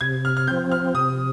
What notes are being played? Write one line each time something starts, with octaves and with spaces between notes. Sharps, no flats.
C3 G#6
F6
F6
F3 C4 G6
F6
C3 D#6